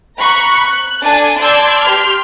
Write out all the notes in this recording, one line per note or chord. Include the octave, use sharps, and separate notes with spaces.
A#5 B5 C#6 F#6
F#6
D4 A4 G#5 A6
D5 A5 C6 E6 G6 G#6
G4 C6 F6